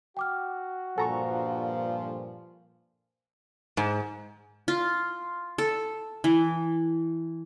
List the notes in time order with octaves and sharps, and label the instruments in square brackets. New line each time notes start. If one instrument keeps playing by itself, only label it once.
[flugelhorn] F#4 [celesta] G5 D6 F6
[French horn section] G2 A#2 F3 [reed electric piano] A4 A#5 C#6 [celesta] F#5 G#5
[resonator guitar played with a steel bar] G#2
[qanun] F4
A4
E3